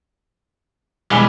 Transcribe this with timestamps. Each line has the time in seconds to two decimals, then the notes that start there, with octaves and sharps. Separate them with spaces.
1.11 B1 E3 G3 G#3